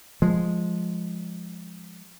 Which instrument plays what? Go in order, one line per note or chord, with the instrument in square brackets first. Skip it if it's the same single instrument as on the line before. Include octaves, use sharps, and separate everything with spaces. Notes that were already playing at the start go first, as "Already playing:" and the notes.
[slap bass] F3 G#3